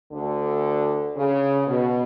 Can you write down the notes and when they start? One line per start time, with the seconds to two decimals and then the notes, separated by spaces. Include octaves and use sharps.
0.12 D2 D3
1.16 C#3
1.67 B2